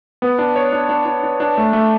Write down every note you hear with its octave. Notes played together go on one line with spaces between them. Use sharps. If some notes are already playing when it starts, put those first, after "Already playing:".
B3
D4
C#5
D4
D4
D4
D4
D4
A3
A3